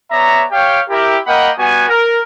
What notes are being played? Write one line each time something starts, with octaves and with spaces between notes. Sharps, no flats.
B3 C#5 D5 E5 A#5
G4 C#5 F5 G5
E4 G4 A#4
A#3 A#4 D#5 F#5 G5 B5
G3 B3 F#4 G#5
A#4